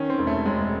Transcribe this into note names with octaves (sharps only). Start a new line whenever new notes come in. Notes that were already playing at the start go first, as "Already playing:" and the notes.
Already playing: D#3 C#4
C4
E1
A3
E1 G#3